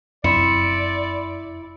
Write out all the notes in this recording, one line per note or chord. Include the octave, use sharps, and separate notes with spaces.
F1 F#2 C4 E4 D5 B5 C6 C#7